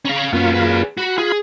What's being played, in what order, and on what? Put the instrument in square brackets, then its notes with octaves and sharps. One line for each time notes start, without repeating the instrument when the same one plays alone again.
[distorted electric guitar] C#4 F5 [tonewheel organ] A#5 B5 C#6
[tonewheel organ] F#2 A#3 F4 [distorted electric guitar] B3 C#4
[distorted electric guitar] G#4 B4
[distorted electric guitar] F#4 [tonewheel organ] B5
[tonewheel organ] F4 B5 [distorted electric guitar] G#4